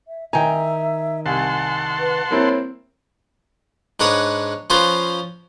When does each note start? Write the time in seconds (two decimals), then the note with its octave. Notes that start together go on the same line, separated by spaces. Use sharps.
0.08 E5
0.33 D#3 E5 G5 G#5 A#5
1.26 C2 F#5 G#5 A5 C6
1.99 B4
2.31 A#3 C4 E4 C#5
4.00 G#2 D4 B4 C#5 F#5 D#6
4.70 F3 C#4 F4 B4 C5